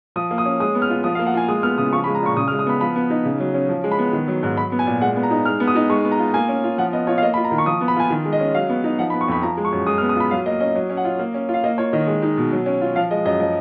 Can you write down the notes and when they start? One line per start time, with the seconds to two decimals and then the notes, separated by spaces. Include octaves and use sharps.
0.16 F3 D#6
0.31 A#3
0.38 D#6
0.45 C#4
0.60 G#3 D#6
0.75 B3
0.82 F6
0.90 F4
1.04 F3 D#6
1.15 F5
1.19 A#3
1.26 F#5
1.34 F4 G#5
1.48 G#3 D#6
1.63 B3 F6
1.78 C#3 D#6
1.93 F3 C#6
2.04 B5
2.07 G#3
2.15 A#5
2.23 A#2 C#6
2.37 C#3 D#6
2.48 F6
2.51 G#3
2.59 D#6
2.66 B3 B5
2.81 F3 B5
2.96 B3
3.10 D#4
3.25 C#3
3.40 F#3
3.54 C#4
3.69 F3
3.84 G#3
3.91 B5
3.99 B3
4.13 D#3
4.28 F#3
4.43 G#2
4.57 F#3 B5
4.72 B3
4.79 G#5
4.87 A#2
5.01 G#3 F#5
5.16 B3
5.23 A#5
5.31 D#4
5.45 G#3 F6
5.60 B3
5.68 D#6
5.75 D#4
5.90 G#3 C#6
6.05 B3
6.12 A#5
6.19 F4
6.34 A#3 G#5
6.49 C#4
6.64 F4
6.78 F3 F#5
6.93 B3 D#5
7.07 F4 C#5
7.18 F5
7.22 A#3 D#5
7.34 B5
7.37 F4
7.44 A#5
7.51 D#3
7.58 C#6
7.66 F3 D#6
7.81 B3
7.88 B5
7.96 F4 G#5
8.10 D#3
8.25 G#3
8.32 D#5
8.40 C#4
8.54 F#3 F5
8.69 B3
8.84 D#4
8.99 F3 F#5
9.10 B5
9.14 B3
9.21 C#6
9.28 F2 B5
9.43 F3 A#5
9.57 G#3
9.65 C#6
9.72 F#2
9.87 G#3 D#6
9.98 F6
10.02 B3
10.09 D#6
10.16 F4 B5
10.31 F#3 F5
10.46 A#3 D#5
10.60 C#4 D#5
10.75 F#3
10.90 C#4
10.97 F#5
11.05 F4
11.19 A#3
11.34 C#4
11.49 F4
11.54 F5
11.63 A#3 D#5
11.78 F4 C#5
11.93 D#3 D#5
12.07 G#3
12.22 D#4
12.37 B2
12.52 F#3
12.66 C#4
12.81 F4
12.95 F3 F5
13.11 G#3 D#5
13.25 F#2 D#5
13.40 F3 D#5